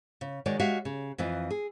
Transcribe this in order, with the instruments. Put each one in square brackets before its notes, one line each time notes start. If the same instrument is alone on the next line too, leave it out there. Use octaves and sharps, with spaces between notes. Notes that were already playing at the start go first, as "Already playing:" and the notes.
[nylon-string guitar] C#3
D#3 G#3 F#4 C#5 D5
G#3 F#4 G4 E5 F5
C#3
F2 E3 F4 D#5
G#4